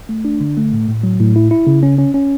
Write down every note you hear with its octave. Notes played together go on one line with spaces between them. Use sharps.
A3
D4
D3
A3
A2
A2
F#3
A2
E4
E4
C#3
C#4
C#4
C#4